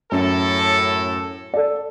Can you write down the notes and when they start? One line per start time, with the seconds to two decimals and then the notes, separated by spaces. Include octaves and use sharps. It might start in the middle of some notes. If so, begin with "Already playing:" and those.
0.12 F#2 A2 A4
1.54 A4 D5